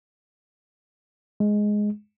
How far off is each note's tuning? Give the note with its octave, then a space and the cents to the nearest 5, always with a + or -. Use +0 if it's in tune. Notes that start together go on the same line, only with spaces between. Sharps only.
G#3 +5